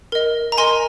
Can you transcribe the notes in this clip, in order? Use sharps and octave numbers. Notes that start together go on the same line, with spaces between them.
A#4 D#5
A#5
A#4 D#5 G#5 C6